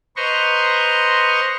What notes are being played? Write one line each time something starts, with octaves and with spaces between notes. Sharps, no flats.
B4 C5 D#5 A#5 C6 C#6